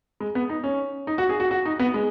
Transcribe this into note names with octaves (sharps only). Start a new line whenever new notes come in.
G#3
B3
D#4
C#4
D#4
F#4
G#4
F#4
F#4
D#4
B3
G#3